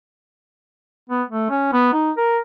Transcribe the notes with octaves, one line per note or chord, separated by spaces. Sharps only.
B3
A3
C#4
B3
D#4
A#4